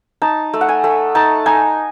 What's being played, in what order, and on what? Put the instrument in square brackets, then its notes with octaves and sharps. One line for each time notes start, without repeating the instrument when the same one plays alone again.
[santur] D#4 A5
A3
F#5
G#5
A3
D#4 A5
D#4 G#5